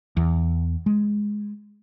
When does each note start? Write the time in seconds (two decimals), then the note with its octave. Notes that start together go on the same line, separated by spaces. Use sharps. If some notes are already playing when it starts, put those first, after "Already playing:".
0.17 E2
0.86 G#3